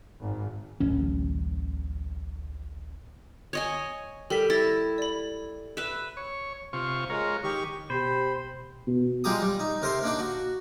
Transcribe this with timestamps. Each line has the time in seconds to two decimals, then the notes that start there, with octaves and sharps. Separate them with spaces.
0.20 G#1
0.80 D1 A1 C#4
3.53 C#5 D#5 G#5
4.30 G3 A4 A#4 B6
4.50 E4 A6 A#6
4.98 D5 B5
5.77 B4 E5
6.17 C#5
6.73 C3 F4 C#6
7.10 G#3 F4 A#4 C#5
7.44 D#3 G4 C#6
7.90 B2 G4 C5 B5
8.87 B2
9.24 G3 G#3 F4 G4 A#5 D#6
9.42 G3
9.60 D#4
9.82 C3 A#4 C5 C6
10.03 A#3 D4 D#4 D5
10.19 F#4